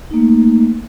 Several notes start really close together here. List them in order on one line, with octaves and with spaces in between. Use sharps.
D#4 A#3 A3